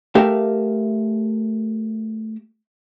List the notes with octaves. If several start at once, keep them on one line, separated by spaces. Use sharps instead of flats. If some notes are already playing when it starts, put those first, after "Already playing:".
A3 G4 A#4 E5 F5